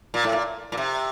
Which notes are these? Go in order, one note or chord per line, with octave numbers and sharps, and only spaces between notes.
A#2
A2
A#2
A#2
C3